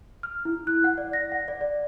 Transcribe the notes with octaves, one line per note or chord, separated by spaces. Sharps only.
F6
E4
F#6
F#5
D5
A#6
F#5
D5
D5